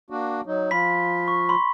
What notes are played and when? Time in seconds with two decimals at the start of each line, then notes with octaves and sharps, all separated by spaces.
0.10 A#3 D4 F#4
0.46 F#3 D#4
0.71 F3 F4 B5 B6
1.28 C#6
1.49 B5 C6